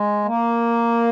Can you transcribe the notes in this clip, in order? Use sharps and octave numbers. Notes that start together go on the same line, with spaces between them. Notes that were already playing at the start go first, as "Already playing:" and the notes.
Already playing: G#3
A#3